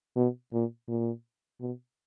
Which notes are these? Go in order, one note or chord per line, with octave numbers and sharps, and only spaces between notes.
B2
A#2
A#2
B2